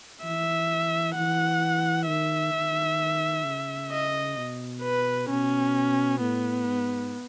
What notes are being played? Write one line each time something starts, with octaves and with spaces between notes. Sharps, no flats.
E3 E5
E3 F#5
D#3 E5
D#3
C#3
D#5
B2
B4
B2 C#4
A2 B3
G#2